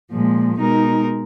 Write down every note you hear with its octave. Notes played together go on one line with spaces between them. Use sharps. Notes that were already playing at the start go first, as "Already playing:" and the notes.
A#2 F3 G#3
B2 G#3 D#4 A#4